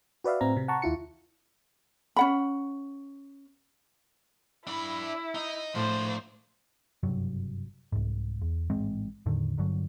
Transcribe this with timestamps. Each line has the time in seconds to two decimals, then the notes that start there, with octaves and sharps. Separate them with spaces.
0.24 F#4 B4 D5 E5 F5
0.41 A2 C4 A#5
0.57 C3
0.68 F#5 A5 A#5 C#6
0.82 D#2 E4 F4 C#7
2.16 C#4 F#5 B5
4.67 D4 E4 B5
5.35 D#4 D#5
5.75 A2 F3 D4 C5
7.03 F#1 G2 C3 F#3
7.92 C2 G#2
8.42 E2
8.70 A1 G#2 G#3 C4
9.26 E2 A2 D3 D#3
9.58 G1 G2 D3 F#3